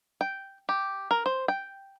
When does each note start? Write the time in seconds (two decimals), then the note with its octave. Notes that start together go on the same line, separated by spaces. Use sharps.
0.21 G5
0.69 G4
1.11 A#4
1.26 C5
1.48 G5